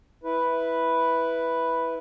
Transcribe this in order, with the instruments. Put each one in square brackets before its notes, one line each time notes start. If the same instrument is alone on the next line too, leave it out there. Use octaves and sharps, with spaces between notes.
[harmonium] E4 B4